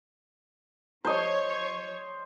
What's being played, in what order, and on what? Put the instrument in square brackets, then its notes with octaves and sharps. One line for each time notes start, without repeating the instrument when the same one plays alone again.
[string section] F3 C#5 [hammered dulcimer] C5 D#5